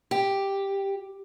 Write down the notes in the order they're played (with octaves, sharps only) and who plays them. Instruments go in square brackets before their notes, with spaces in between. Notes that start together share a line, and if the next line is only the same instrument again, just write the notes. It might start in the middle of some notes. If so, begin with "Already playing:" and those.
[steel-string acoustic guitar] G4